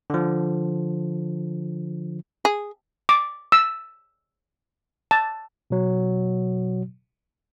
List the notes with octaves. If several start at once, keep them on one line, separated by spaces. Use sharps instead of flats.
D3 F3
G#4
D6
E6
A5
B2 F#3